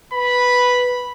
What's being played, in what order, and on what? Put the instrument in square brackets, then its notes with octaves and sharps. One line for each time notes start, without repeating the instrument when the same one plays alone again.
[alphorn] B4 [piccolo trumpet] B5